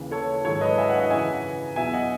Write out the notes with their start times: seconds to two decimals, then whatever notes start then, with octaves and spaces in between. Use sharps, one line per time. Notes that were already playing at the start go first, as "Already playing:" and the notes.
Already playing: D#2 C#3 E3
0.11 A4 C#5
0.44 G#2 D#3 F#3 A4 C#5
0.61 B4 D#5
0.78 E5 G#5
0.88 D#5 F#5
1.00 D#5 F#5
1.10 F#2 C#3 E3 E5 G#5
1.76 E2 B2 F#3 E5 G#5
1.93 D#5 F#5